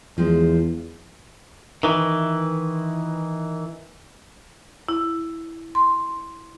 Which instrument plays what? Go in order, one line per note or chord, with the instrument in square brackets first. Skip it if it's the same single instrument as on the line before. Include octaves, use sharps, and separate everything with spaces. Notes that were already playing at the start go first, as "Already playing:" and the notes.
[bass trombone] E2 [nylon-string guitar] F3 G#3
[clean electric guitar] D#3 E3
[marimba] E4
C6